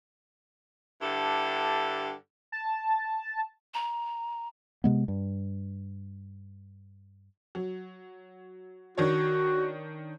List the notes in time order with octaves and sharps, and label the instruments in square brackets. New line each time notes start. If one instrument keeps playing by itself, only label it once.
[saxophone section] G2 D3 E4 G4 A4
[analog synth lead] A5
[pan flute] A#5
[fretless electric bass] C3 G#3 B3
G2
[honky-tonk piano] F#3
[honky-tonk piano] D#3 D4 C#5 [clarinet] F#4